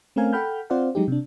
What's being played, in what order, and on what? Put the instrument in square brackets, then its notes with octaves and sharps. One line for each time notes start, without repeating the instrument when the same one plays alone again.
[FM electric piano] A3 C4 C#4 A#4 F5 G#5
A4 F#5 G5 B5 F6 G6
C4 F4 C5 D5 F5 F#5
F#3 G#3 D#4 G4
C3 D4